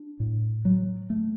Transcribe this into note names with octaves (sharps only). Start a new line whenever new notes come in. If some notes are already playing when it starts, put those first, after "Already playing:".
Already playing: D4
A2
F#3
A3